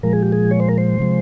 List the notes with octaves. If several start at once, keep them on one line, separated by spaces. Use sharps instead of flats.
A#2 F3 G#3 A#4
G#4
G4
G#4
C#5
C5
A#4
C5
C3 F3 G#3